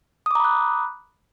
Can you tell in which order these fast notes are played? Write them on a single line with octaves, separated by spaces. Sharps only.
D#6 D6 A#5 B5 F#6